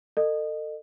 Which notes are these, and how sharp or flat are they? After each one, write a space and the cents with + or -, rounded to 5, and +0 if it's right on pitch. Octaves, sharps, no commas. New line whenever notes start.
A4 +35 D#5 -30